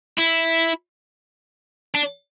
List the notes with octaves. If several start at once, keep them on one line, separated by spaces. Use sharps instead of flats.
E4
D4